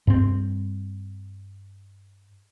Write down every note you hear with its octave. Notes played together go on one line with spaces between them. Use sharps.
G2 C4